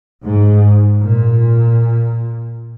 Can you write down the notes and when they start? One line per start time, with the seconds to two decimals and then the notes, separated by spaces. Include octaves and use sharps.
0.23 G#2
1.04 A#2